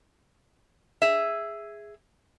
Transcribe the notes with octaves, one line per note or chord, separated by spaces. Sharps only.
G#4 E5